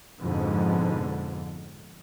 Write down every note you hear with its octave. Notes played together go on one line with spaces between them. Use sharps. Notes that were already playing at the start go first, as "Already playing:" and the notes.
F2 G#2 B2 D3